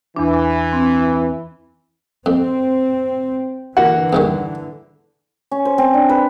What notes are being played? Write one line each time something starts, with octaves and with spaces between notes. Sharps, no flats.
E2 E3 D4
C4
F2 C4
D3 E3 A#3 F#4
E2 G2 D#3
C#4
C5
C4
D4
B4